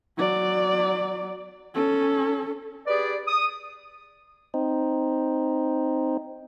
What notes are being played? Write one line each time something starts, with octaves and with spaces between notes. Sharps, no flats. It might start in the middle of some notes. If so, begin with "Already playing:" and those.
F#3 D5
C#4 A4
G4 G#4 B4 D5
D#6
C4 D#4